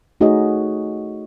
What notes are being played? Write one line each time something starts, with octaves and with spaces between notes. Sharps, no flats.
A3 D#4 F#4 G#4 C#5 D#5